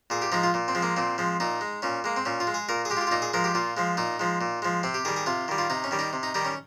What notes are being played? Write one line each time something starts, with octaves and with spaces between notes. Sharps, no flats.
A#2 G#4
G4
F3 G#3 D#4
F4
A#2
C4
F3 G#3
A#3
A#2 C4
F3 G#3
A#2 D#4
G#3
A#2 C#4
G#3 A#3
C4
A#2 C#4
F4
G#3
G#4
A#2 A#4
G#4
G#3 G4
F4
G4
F4
A#2 D#4
G#4
F3 G#3 A#4
G4
A#2 F4
F3 G#3
A#2 D#4
F3 G#3
A#2
F3 G#3
C3 C4
G4
D#3 G3 G#4
G#4
C3 F4
D#3 G3
F4
C3 D#4
C#4
D#3 G3
D#4
C3
D#4
D#3 G3 D#4
C#4